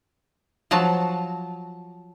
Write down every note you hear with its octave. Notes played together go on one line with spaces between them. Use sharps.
F3 F#3 F#4 A5